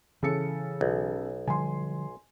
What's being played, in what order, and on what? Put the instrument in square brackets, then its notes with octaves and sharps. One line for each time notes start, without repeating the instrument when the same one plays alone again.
[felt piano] C#3 A4 C#7 [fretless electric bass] E3
[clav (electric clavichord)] B1
[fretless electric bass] D3 F3 G3 [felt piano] G#5 C6